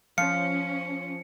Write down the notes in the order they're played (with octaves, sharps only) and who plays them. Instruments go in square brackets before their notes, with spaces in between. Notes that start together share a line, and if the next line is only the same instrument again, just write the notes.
[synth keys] F3 [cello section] C#4 [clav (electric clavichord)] F5 [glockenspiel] C#7